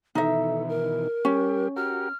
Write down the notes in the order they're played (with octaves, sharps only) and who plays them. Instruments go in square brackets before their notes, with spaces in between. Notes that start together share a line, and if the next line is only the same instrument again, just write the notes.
[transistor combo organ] B2 D#3 E3 [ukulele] D#4 E5 [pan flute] A4
[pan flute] A#4
[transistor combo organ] G3 G4 [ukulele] C#4
[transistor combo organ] F#4 G4 A#4 [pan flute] F6